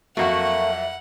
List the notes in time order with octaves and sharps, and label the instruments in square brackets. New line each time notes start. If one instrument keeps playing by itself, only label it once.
[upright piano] F2 F#3 [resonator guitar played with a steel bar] A3 A#3 F#4 [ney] E5 [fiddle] F#5